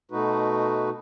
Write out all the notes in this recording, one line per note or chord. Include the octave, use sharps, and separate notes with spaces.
B2 A3 D#4 F#4 B4